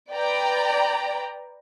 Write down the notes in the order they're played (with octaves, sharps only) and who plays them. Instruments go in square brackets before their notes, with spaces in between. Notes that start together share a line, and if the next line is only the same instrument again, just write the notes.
[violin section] B4 D5 G5 A#5